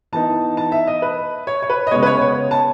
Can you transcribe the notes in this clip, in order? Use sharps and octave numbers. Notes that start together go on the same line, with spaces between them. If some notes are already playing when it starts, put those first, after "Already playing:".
E3 B3 D#4 A5
A5
E5
D#5
B4
C#5
C#5
B4
D#5
C#3 G#3 B3 C#5
B4
C#5
C#5
A5